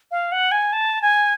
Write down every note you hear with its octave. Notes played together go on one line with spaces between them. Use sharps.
F5
F#5
G#5
A5
G#5